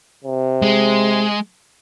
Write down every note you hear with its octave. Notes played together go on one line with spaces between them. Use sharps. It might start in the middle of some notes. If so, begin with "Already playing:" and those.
C3
G#3